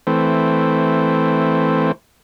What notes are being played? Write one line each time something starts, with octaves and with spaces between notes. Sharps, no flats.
E3 A3 C4